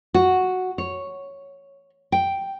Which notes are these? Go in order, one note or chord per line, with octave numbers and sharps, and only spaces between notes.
F#4
C#5
G5